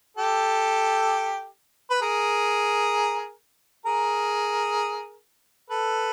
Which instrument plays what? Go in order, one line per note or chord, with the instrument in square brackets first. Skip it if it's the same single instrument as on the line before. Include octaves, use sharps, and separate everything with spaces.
[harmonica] G4 A4
B4
G#4 A#4
G#4 A#4
A4 B4